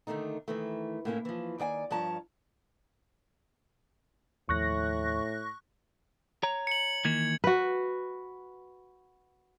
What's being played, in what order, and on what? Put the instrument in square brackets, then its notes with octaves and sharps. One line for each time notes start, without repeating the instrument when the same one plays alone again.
[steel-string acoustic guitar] D3 D#3 G3 A3 D#4
D#3 E3 A3
A2 A#3 C#4 E4
E3 F3
D#2 D#3 D5 G5 G#5
G2 F3 C#5 A5 A#5
[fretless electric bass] D#2 F3 [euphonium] A2 [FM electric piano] C#6 F#6 A#6
[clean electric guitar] C#5 A#5
[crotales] C#7 F#7
[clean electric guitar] D#3 E3 A#3 [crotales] G#6
[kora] F#4 B4